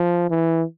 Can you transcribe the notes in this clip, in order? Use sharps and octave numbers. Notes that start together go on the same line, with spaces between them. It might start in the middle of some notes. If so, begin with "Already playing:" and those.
Already playing: F3
E3